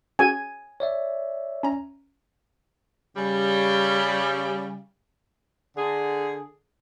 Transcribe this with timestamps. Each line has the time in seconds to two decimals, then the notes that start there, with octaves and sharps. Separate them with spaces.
0.19 C#4 F#4 G#4 G#5
0.80 C#5 D5 E5
1.63 C#4 A#5
3.17 C#3 G3
5.77 D3 G#4